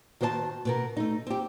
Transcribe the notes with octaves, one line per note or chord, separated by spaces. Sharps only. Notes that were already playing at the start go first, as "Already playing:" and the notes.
D#3 F#4 C5 C#5 A5
B2 B3 A#4
A3 D#4
C4 G4